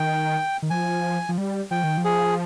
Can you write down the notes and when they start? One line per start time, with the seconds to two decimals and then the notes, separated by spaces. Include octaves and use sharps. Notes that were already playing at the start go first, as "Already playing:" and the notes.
Already playing: D#3 G5
0.62 D#3
0.70 F3 G#5
1.29 F3
1.38 G3
1.71 F3 G5
1.84 D#3
1.98 F3
2.05 G#4